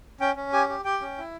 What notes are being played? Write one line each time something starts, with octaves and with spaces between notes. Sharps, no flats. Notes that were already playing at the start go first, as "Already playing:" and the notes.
C#4 G5
C#4
G4 G#5
G4
G4 G5
C#4
E4